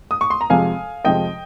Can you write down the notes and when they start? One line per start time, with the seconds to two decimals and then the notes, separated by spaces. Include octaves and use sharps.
0.11 D#6
0.21 C#6
0.30 C6
0.41 A#5
0.50 F2 C3 F3 G#3 F5 G#5
1.04 F2 C3 F3 G#3 D#5 G5